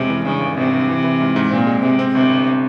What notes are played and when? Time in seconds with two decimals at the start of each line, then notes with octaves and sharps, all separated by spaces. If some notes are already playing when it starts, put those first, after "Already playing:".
Already playing: F2 C3 G#3 C#4
0.10 E3
0.25 G2 C#3
0.41 G#1
0.57 G#1 C3
0.73 G2
0.89 E3
1.04 E3
1.21 G#2
1.36 G#2
1.51 A#2 C4
1.67 G#3
1.82 C3 G#3
1.99 C4
2.14 G1 C3
2.30 G1